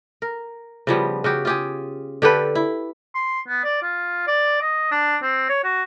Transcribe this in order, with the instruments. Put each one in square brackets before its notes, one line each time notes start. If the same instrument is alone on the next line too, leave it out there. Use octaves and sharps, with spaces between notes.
[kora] A#4
C#3 F3 G3 B3
C#3 F#4 G4
F4 G4 G#4
D3 G4 A4 B4
E4
[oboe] C6
B3
D5
F4
D5
D#5
D4
C4
C#5
F#4